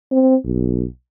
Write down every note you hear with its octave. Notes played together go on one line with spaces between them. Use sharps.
C4
B1